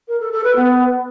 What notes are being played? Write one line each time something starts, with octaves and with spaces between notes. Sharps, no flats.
A#4
A4
A4
B4
B3